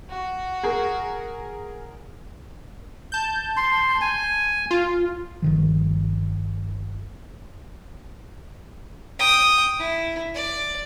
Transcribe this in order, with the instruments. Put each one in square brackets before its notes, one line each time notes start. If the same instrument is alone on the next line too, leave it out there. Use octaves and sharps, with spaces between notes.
[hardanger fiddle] F#4
[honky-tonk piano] G#4 A#4
[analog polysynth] A5 G6
[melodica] C6
G#5
[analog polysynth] F4
[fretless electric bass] G1 D#3 F3
[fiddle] G5 D#6
E4
D5